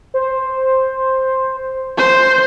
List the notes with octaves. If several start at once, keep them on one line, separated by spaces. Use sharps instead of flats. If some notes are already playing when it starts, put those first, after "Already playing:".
C5
C5